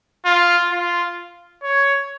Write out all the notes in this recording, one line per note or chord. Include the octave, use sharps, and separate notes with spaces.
F4
F4
C#5